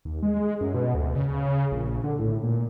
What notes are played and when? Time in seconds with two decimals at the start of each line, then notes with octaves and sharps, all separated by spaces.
0.05 D#2
0.23 G#3
0.61 F#2
0.74 B2
0.94 D2
1.15 C#3
1.72 A#1
2.04 D3
2.19 A2
2.43 A#2